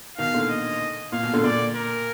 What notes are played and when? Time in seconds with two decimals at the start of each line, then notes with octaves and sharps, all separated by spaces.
0.18 B2 D#3 F5
0.34 A#2 D3
0.50 D#5
1.12 A#2 F5
1.23 B2
1.33 A#2 D3
1.44 A#2 D5
1.76 A#4